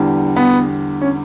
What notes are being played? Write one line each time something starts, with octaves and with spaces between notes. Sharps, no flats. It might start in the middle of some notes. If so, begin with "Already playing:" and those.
Already playing: E2 D3 G3
B3
C#4